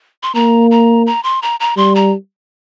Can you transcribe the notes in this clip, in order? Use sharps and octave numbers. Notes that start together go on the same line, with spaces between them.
C6
A#3 A#5
A#5
A#5
C6
A#5
A#5
G3 C6
A#5